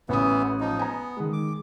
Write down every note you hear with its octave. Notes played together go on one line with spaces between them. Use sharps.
A1 E3 B3 D#6
F3 D#4
B3 G#5 A#5
D#3 G#3
D6